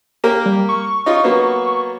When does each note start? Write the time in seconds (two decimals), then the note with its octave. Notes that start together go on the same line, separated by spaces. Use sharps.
0.24 A#3 G4 A#4
0.46 G3
0.69 C#6
1.06 D#4 F4
1.24 F#3 A#3 B3